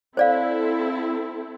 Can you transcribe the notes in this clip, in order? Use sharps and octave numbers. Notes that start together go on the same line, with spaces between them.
C4 E4 A4 C5 D5 F5